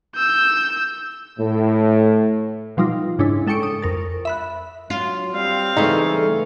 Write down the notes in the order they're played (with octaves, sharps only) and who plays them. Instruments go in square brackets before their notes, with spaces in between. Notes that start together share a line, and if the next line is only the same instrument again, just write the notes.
[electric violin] E6 G6
[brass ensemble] A2
[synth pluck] B2 F3 G3 D#4 F4
G#2 C#3 D4 E4
G#3 A4 G5 C#6 C#7 D7
D#6
F2 A#4 A6
E5 B5 F#6
[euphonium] F#3 [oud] F4
[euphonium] G3 [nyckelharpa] C4 F5
[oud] C#3 G3 A3 [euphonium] E3 [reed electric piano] D#4